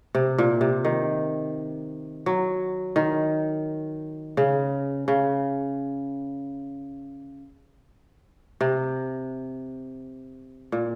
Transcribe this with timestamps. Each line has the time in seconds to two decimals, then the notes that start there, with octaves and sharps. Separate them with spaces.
0.15 C3
0.38 A#2
0.61 C3
0.85 D#3
2.26 F#3
2.96 D#3
4.37 C#3
5.08 C#3
8.61 C3
10.72 A#2